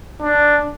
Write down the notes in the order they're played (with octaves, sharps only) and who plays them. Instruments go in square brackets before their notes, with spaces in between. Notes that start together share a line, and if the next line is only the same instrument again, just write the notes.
[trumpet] D4